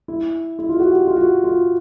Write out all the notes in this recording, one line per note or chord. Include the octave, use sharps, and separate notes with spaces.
E4
E4
F4
F#4
G4
F4
F#4
F4